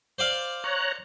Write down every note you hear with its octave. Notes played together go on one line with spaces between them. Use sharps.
C5 D5 F5
C#5 A#5 F#6